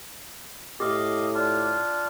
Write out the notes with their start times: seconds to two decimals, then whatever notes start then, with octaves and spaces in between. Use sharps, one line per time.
0.80 A2 G4 D#5 F5
1.34 D4 F4